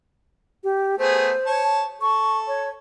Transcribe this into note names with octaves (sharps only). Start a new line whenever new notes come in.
G4
A3 B3 G#4 C5
C#5 A5
A4 C#6
C#5